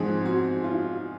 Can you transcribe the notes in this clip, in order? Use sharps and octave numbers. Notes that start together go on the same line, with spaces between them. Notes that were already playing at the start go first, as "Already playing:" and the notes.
Already playing: G#2 F3 G#3 C4 G#4
F#4
F4